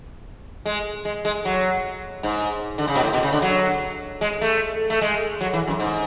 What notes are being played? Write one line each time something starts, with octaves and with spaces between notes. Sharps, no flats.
G#3
G#3
G#3
F#3
G#2
D3
C#3
B2
A2
B2
C#3
D3
F#3
G#3
A3
A3
G#3
F#3
E3
F#2
G#2